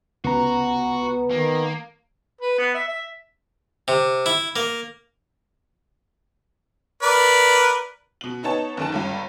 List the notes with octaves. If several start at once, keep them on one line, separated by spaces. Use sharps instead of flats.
C#2 B3 F#4 A#5
D#3 A#3
B4
B3
E5
E5
C3
E4
A#3
A#4 B4 D5
B2 F#7
B3 D#4 C#5 A5
F#1 D#3 A5
G1 C#2 G2